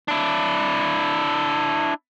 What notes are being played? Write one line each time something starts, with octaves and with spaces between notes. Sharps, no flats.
D4 E4